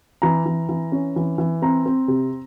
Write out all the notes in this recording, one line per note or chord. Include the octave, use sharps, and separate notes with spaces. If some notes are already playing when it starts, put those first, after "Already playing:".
E3 A#5
E3
E3
C#4
E3
E3
C4 A#5
C4
C3